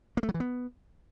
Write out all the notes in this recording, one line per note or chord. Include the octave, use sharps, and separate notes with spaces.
A#3
A3
F#3
E3
B3